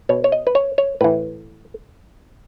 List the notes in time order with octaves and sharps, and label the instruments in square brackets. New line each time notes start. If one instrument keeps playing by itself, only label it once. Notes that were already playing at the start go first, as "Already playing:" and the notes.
[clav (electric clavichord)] B2 C#5
C#5
D#5
B4
C#5
C#5
A2 E3 B4